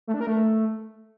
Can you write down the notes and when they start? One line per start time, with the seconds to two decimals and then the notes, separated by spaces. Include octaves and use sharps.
0.07 A3
0.14 D4
0.21 A#4
0.27 A3